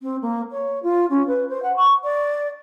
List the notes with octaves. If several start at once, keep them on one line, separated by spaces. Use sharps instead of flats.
C4
A#3
C#5
F4
C#4
B4
C5
F#5
C#6
D5